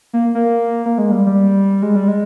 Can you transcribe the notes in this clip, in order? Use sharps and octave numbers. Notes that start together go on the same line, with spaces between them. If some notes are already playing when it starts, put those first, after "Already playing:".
A#3
A#3
A#3
G#3
G3
G3
G#3
G3
G#3